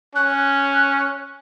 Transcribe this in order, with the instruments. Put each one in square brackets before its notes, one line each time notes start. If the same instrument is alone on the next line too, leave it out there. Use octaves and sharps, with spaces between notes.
[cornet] C#4 [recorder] F#6